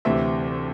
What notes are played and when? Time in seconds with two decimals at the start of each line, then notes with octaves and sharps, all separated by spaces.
0.05 D2 C3 E3 E5